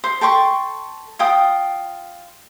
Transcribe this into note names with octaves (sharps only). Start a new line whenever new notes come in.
C5
A4 G5 C6 C#6
F4 G5 D#6